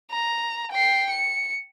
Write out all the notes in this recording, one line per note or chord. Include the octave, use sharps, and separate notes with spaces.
A#5
G5 C7
C#7